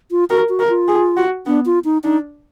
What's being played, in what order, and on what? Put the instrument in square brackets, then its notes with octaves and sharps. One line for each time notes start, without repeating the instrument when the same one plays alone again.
[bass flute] F4
[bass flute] F#4 [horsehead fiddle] A#4
[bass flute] F#4
[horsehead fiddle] A#4
[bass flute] F4
[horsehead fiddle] G#4
F#4
[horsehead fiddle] B3 [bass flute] D4
[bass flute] F4
D#4
[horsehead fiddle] D4 [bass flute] D#4